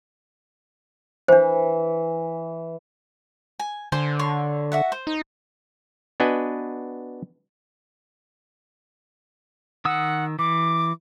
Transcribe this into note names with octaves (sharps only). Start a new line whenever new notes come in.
E3 D4 C5
G#5
D3 C5 G#5
C#5 C6
F#4 E5 F#5
C5
D#4
B3 D4 F#4 B4 D#5 G#5
D#3 F#5 D#6 E6
E3 D6